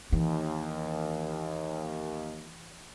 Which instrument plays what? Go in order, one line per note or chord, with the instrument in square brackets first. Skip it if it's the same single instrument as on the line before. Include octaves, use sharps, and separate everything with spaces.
[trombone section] D#2 [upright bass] E3